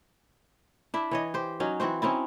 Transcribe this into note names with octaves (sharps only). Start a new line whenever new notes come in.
D4 E4 E5
E3 C#5 D#5
G4 C5
F#3 C#4 D#4
E3 C4 F#4 C5
C4 C#4 D#4 E4